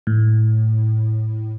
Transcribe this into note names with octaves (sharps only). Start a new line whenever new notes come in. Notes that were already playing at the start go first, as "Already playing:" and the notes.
A2